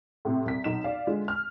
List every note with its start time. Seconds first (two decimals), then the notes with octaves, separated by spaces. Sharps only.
0.25 A2 C3 C4
0.45 C2 B6
0.64 B1 D#4 E7
0.84 D5 F5
1.07 D3 G#3 F4
1.28 F6